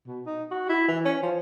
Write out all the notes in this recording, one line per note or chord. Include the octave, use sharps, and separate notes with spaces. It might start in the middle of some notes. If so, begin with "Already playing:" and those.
B2
D#4
F#4
E4
E3
C#4
F3